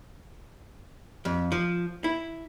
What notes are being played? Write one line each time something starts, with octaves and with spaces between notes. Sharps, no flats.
F2
F3
E4